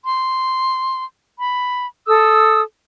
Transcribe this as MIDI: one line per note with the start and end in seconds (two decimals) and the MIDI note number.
0.05 1.03 84
1.39 1.85 83
2.07 2.60 69
2.07 2.60 87
2.07 2.60 88